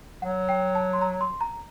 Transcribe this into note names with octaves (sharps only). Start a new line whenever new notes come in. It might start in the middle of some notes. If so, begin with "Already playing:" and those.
F#3 F#5
G5
A5
C6
A#5
C6
A#5